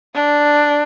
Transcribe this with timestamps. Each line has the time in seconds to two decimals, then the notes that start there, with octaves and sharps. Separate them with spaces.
0.15 D4